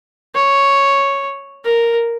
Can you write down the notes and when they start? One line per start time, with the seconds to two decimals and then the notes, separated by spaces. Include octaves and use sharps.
0.35 C#5
1.64 A#4